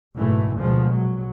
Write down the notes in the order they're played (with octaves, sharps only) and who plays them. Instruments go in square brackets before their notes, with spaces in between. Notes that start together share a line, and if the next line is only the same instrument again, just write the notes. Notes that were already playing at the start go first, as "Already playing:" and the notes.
[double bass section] F#1 G#2 B2 E3 A3
D2 B2 F3 G#3
A#1 F#3